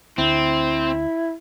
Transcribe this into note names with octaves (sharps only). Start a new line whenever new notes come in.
D2 C4 E4